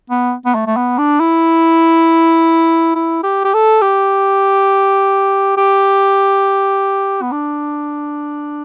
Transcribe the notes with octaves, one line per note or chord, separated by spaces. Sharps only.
B3
B3
A3
A3
B3
D4
E4
E4
G4
G4
A4
G4
G4
B3
D4